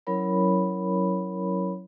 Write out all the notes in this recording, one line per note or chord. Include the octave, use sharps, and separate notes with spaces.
F#3 C#4 E4 A#4 C#5 B5